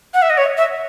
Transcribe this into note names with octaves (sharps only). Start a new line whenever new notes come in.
F#5
E5
D#5
C#5
E5